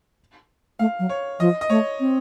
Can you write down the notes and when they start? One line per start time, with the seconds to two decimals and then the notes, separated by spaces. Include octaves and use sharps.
0.79 A3 F5
0.99 F#3
1.09 C#5
1.40 F3 D#5
1.61 D#5
1.70 A3 C#5
2.00 C4